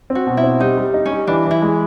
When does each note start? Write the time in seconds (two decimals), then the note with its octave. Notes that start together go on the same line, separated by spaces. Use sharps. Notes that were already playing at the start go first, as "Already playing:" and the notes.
0.10 C4
0.15 F#4
0.27 B2
0.37 E4
0.43 C4
0.60 G3 D#4
0.77 G3
0.94 D#4
1.06 C#4
1.11 G3
1.27 E3 D4
1.45 E3
1.51 E4
1.62 G#3